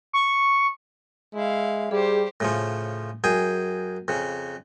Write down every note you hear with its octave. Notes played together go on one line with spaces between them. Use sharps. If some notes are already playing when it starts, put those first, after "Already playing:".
C#6
G#3 E4 F5
G3 G4 G#4 C5
A2 C#3 F3
F#2 G#4 G5 G#5
F2 C#3